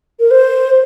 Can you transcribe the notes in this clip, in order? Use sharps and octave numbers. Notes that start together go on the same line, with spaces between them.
A#4
C5